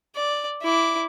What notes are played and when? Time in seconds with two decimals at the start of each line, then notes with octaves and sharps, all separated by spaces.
0.16 D5
0.62 E4 D6